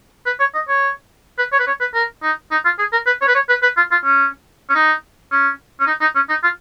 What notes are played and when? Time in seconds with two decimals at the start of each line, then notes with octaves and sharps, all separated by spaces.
0.26 B4
0.40 C#5
0.55 D#5
0.69 C#5
1.39 B4
1.52 C#5
1.60 B4
1.67 C#5
1.80 B4
1.95 A#4
2.23 D#4
2.51 D#4
2.65 F4
2.79 G#4
2.93 A#4
3.06 B4
3.22 C#5
3.28 B4
3.35 C#5
3.49 B4
3.62 B4
3.77 F4
3.91 F4
4.05 C#4
4.70 C#4
4.75 D#4
5.31 C#4
5.80 C#4
5.87 D#4
6.01 D#4
6.15 C#4
6.29 D#4
6.43 F4